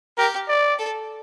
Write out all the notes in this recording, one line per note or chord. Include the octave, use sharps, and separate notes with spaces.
G4 A#4
D5
A4